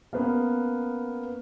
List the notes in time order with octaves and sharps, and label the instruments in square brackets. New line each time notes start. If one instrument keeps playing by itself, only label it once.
[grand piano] A#3 B3 C#4